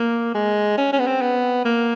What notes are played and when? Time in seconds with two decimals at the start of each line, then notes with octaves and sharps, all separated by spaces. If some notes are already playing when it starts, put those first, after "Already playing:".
Already playing: A#3
0.35 G#3
0.77 C#4
0.92 C#4
0.99 B3
1.07 C4
1.21 B3
1.65 A#3